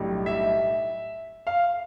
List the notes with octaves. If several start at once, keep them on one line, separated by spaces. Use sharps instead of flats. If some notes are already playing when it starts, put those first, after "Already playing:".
Already playing: B1 A2 G3 D4 G4
E5
F5